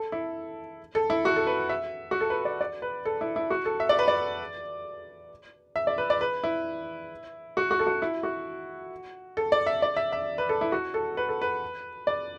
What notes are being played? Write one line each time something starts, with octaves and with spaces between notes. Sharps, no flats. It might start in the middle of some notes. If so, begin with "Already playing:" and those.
Already playing: A4
E4
A4
E4
F#4
A4
B4
E5
F#4
A4
B4
D5
D5
B4
A4
E4
E4
F#4
A4
E5
D5
B4
D5
E5
D5
B4
D5
B4
E4
F#4
F#4
A4
F#4
E4
F#4
A4
D5
E5
D5
E5
E5
B4
A4
E4
F#4
A4
B4
A4
B4
D5